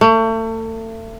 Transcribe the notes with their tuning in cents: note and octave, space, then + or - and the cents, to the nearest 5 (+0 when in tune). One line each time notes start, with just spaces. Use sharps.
A3 +35